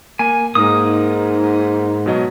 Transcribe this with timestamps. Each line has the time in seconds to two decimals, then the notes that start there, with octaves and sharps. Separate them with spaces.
0.19 A#3 G#5
0.55 G#2 A#3 D#4 A#4 D#6
2.06 B2 F#3 D#5